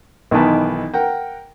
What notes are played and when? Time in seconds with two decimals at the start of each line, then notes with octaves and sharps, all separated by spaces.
0.31 B1 D#3 E3 B3 A5
0.94 A#4 F#5 G5